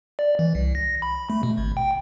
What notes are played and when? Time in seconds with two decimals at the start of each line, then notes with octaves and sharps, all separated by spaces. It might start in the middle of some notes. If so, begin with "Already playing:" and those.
0.19 D5
0.39 E3
0.55 C2
0.75 A#6
1.02 B5
1.30 A3
1.43 B2
1.58 G#1
1.77 G5